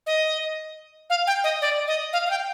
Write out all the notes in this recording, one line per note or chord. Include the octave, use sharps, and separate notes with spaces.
D#5
F5
G5
D#5
D5
D#5
F5
F5
G5